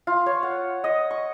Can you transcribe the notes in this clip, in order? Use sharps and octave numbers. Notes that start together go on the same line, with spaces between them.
F4
C#5
F#5
D#5
C#6